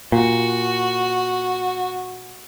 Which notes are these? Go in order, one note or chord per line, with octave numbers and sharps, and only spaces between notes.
A#2 F#4